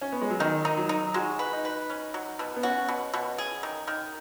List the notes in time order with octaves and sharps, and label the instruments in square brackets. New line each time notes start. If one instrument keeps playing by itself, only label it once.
[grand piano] C#4
B3
G#3
F#3
[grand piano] D#3 [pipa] D#4
[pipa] D#4
[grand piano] F#3
[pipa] D#4
[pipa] G#3 [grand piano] F#4
[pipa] B4
[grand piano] D#4
[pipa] B4
C#4
F#3
B2
[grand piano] B3
[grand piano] C#4 [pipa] F#4
[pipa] B2
B2
G#4
D#3
D#3